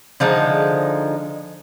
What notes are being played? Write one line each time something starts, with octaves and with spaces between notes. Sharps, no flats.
D3 F3 G#3 D#4